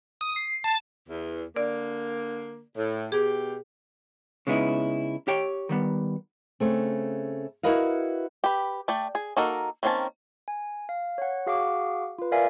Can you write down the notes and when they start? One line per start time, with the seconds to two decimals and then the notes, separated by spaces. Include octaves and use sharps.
0.21 D#6
0.36 C7
0.64 A5
1.08 E2
1.56 D3 A#3 D5
2.76 A2
3.12 B2 G4 G#4
4.47 C#3 G#3 B3 D#4 E4
5.28 G4 C#5 G5
5.69 D#3 G3 B3
6.60 C#3 A3 C4
7.63 E4 F#4 A#4 B4 D#5 F5
8.44 G4 B4
8.88 A3 D5 G5
9.15 G#4
9.37 A#3 D#4 F#4 A4 A#4
9.83 D#3 A#3 C4 C#4 A5
10.48 G#5
10.89 F5
11.18 C#5 F#5
11.47 F#4 G#4 F5 F#5 C#6 D6
12.19 F4 B4
12.32 A#4 B4 D5 E5 F5 G#5